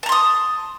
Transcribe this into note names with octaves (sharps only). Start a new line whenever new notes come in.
A5 A#5 C6 D#6